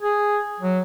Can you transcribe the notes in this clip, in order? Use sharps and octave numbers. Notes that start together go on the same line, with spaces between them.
G#4
F#3